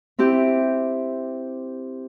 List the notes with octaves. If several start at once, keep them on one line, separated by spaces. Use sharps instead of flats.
C4 E4 G4